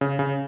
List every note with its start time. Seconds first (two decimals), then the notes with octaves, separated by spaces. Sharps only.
0.01 C#3
0.19 C#3